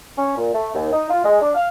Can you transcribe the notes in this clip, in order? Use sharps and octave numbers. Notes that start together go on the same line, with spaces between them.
C#4
A#2
A3
D#2
D#4
F4
G#3
D4
F5